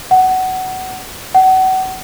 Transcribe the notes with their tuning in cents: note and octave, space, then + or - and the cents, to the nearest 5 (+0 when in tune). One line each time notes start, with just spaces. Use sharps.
F#5 +15
F#5 +30